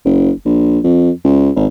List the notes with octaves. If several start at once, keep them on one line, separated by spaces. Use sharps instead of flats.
F#1
A#1
F2
C#2
G#1